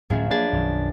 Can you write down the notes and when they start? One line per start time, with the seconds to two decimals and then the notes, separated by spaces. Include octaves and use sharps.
0.10 D1 F#2 A2 F3 C#4 G#4
0.31 A#3 D4 G#4 B4 G#5 A6
0.53 B1 F#2 D#3